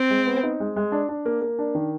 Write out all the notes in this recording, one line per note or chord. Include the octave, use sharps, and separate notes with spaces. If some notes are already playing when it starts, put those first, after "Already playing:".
Already playing: C4
G#3
B3
D#4
G#3
G#3
D4
D4
A#3
A#3
D4
D#3